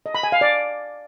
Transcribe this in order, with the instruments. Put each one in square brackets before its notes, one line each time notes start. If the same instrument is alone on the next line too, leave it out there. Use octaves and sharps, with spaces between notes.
[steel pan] D#5
B5
G#5
F5
D5